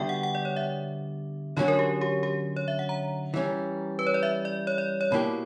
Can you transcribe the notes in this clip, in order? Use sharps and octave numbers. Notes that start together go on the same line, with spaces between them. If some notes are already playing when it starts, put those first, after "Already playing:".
Already playing: D3 G3 B3 F#4 E5 G5
F#5
F#5
D5
C#5
E5
D3 F#3 C#4 F#4 C#5
A#4
G4
G4
G4
C#5
E5
F#5
A#5
E3 G3 C#4
B4
C#5
D5
E5
D5
C#5
D5
C#5
B2 A#3 E4 G4 B5